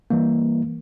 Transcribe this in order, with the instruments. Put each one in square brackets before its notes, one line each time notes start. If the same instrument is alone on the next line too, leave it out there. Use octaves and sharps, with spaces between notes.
[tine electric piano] E3 G3 A#3